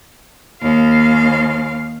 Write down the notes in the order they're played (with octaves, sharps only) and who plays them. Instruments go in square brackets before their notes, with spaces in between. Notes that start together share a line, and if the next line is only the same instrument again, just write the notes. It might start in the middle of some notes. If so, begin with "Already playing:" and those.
[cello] D#2 F5